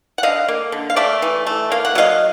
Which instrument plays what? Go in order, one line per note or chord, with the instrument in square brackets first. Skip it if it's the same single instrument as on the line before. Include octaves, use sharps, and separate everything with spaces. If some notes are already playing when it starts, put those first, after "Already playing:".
[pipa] F#5
D3 D#5 F5
A#3
D3
F5
A3 D5 E5
E3
A3
A#3 F5
F#5
F#3 D#5 F5